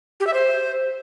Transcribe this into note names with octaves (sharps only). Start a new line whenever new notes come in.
G4
E5
C5